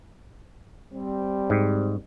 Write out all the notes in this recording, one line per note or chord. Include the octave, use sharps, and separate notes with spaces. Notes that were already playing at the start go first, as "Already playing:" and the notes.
G3 C4
G#2